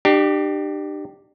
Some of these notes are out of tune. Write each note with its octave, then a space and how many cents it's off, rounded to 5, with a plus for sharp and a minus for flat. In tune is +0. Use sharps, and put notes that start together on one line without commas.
D4 +40 G4 -5